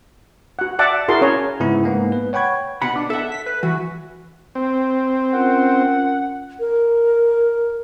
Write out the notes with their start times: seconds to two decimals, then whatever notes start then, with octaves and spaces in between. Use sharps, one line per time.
0.59 F#4 F#5
0.79 D5 E5 F#5 A5 D6
1.08 E4 F#4 G#4 A#4 A5 C6
1.21 C#4 C#5 A#5
1.60 G#2 C#3 B3 E4
1.84 G#2 A#3 B3
2.12 B4
2.33 C#5 F#5 G5 B5 C#6 G#6
2.82 B2 F#5 B5
2.96 D4
3.10 A4 E5 F#5
3.32 B6
3.46 B4
3.63 E3 F#4
4.55 C4
5.33 C#4 F4 A#4 F#5
6.60 A#4